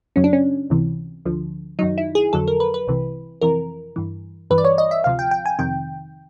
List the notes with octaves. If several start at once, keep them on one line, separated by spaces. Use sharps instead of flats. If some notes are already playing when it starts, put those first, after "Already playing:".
F#2 C#3 F#3 C#4
D4
C#4
C#2 C3 E3
D2 D3 F3
F#2 D#3 F#3 D#4
E4
G#4
F2 D3 F#3 A4
A#4
B4
B4
C2 C3 E3
F2 C3 E3 A#4
G2 E3
G2 E3 B4
D5
C#5
D#5
E5
D2 C3 F3 F5
G5
G5
G#5
F2 C3 D#3 G5